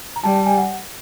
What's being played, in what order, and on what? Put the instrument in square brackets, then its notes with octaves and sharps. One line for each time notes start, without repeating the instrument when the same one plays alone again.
[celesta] A#5
[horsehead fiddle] G3 [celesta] A5
[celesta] A5
G#5
F#5